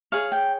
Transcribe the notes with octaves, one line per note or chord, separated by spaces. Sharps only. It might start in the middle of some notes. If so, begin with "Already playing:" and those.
G#4 C#5 F5
G5